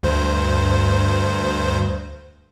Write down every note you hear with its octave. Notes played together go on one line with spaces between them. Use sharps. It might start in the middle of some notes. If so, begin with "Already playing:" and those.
D2 G2 C5